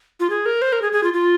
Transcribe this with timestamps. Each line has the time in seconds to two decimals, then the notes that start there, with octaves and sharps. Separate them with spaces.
0.20 F4
0.30 G#4
0.46 A#4
0.62 C5
0.73 A#4
0.82 G#4
0.92 G#4
1.04 F4
1.14 F4